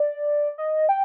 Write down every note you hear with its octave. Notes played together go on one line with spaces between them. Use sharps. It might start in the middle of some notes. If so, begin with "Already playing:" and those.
Already playing: D5
D#5
G5